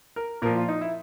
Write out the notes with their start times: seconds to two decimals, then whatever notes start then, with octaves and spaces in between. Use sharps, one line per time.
0.16 A#4
0.42 A#2 F3 A#4
0.55 F4
0.68 D#4
0.81 E4